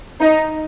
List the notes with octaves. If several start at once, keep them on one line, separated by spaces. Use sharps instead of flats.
D#4